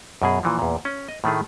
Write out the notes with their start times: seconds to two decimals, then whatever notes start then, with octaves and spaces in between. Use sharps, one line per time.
0.22 F#2 B2 G#4
0.43 A#2 E3 F3
0.59 E2 A#2
0.85 C#4
1.08 D#5
1.24 A2 D#3 A3 G#4